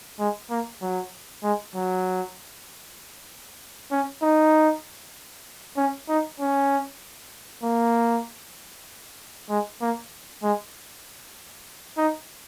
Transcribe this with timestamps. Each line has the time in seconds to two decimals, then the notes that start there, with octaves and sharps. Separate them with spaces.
0.19 G#3
0.50 A#3
0.82 F#3
1.43 G#3
1.75 F#3
3.92 C#4
4.22 D#4
5.77 C#4
6.09 D#4
6.40 C#4
7.63 A#3
9.50 G#3
9.81 A#3
10.43 G#3
11.97 D#4